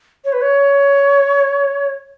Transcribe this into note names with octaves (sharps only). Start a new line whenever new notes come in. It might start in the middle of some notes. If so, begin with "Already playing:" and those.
C#5
B4
C#5